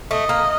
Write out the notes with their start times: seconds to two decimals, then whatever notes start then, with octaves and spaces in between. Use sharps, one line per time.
0.11 A3 D#5
0.29 A#3